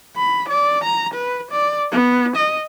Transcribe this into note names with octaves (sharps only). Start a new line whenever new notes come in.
B5
D5
A#5
B4
D5
B3
D#5